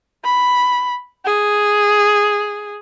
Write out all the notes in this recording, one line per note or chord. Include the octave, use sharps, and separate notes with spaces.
B5
G#4